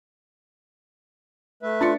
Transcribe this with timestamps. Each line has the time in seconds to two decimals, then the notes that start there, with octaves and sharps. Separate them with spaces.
1.63 A3 B4 E5
1.81 D4 F4 A6 C#7